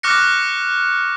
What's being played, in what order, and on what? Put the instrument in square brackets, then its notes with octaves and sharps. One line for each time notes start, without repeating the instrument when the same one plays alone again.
[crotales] C#6 D6 F6 F#6 A#6 C#7